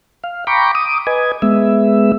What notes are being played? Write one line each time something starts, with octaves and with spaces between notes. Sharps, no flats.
F5
G5 A#5 B5 C#6 D6
D6 D#6
B4 D#5 G#5
G#3 B3 E5